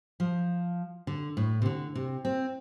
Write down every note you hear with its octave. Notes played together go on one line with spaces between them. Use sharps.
F3
D3
A2
C3
D3
C3
C4